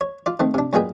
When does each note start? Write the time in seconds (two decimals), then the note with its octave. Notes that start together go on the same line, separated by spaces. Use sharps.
0.01 C#5
0.26 F4 D5
0.40 D#3 A3 C4
0.54 C3 D4
0.73 F#2 A#2 G#3 B3 G#4 G5